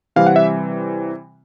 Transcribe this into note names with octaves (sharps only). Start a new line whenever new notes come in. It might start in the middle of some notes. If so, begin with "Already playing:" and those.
C3 E3 G3 C4 F5
F#5
E5